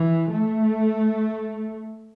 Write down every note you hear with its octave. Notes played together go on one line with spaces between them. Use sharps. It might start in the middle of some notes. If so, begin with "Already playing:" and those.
Already playing: E3
A3